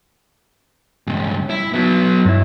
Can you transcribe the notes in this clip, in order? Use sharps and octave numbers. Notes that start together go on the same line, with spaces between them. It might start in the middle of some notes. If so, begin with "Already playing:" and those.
C#2 G2
E4
F#3 B3
G2 E4